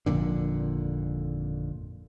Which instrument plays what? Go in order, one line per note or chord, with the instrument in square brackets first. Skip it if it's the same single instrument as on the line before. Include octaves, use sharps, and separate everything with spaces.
[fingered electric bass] G#1 F2 A#2 D3